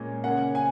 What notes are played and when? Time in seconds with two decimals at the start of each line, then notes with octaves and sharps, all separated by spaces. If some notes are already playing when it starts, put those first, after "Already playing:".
Already playing: A#2 G#3 C#4
0.24 C#3 A#3 C#4 F#5
0.55 G#5